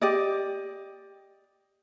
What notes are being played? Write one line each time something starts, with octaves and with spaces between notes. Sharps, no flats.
G4 D5 D#5